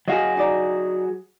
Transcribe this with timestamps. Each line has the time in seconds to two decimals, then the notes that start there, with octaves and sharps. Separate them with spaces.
0.08 F#3 F#4 G#4 D#5 F5
0.37 D#4 D5 A#5